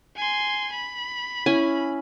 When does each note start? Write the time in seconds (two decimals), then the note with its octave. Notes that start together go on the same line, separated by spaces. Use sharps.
0.16 G#5 C6
0.72 B5
1.46 C#4 E4 G#5